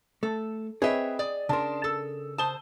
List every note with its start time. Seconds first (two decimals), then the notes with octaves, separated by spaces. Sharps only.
0.23 A3 A4
0.82 C4 G#4 B4 C#5 D#5 E5 G5
1.19 D5 D#6
1.49 C#3 D4 A#4 A5 C6
1.84 A4 E6
2.38 C5 A5 D#6 G7